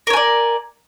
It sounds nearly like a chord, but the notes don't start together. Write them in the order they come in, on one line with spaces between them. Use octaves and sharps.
A#4 C#5 G#5 D5